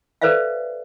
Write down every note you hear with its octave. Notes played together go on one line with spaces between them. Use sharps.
A4 B4 C5 D5 E5 F5